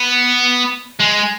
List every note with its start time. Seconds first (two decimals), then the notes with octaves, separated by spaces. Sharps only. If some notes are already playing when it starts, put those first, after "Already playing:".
Already playing: B3
1.00 G#3